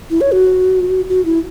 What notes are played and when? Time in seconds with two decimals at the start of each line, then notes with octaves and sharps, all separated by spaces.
0.10 E4
0.21 C#5
0.32 F#4
1.09 F#4
1.25 E4